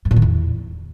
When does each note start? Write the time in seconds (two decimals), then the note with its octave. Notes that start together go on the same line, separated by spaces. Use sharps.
0.05 G#2
0.11 A#2
0.16 D#3
0.22 E2